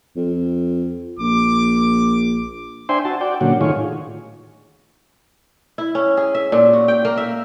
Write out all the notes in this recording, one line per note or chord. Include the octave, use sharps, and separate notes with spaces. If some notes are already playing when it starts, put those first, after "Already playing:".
F2
A#1 D6
D4 C5 E5 G5 G#5 C6
F#4 A5
F#4 D5 G5
A#2 D3 F#3 C#4 F#4
A2 D#3 F4 G#4 C#5
E4
C#4
G#4
E5
A#2
F#4
G5
A#3
E5